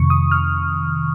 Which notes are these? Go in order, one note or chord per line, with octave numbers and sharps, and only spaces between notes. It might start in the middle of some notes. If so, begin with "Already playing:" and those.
Already playing: F2 C3 D#3 C#6
D#6
F6